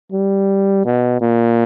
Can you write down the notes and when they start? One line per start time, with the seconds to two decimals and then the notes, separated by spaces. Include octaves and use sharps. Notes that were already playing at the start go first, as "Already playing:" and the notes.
0.12 G3
0.85 B2
1.21 A#2